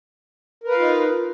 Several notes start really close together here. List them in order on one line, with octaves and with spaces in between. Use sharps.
A#4 B4 F5 F4 D#4